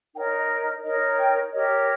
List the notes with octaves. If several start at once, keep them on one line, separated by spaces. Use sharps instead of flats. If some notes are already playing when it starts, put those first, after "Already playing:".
D#4 A#4 C#5 G5
D#5
D#5
D#4 A#4 C#5 D#5
G5
G4 A#4 C#5 D#5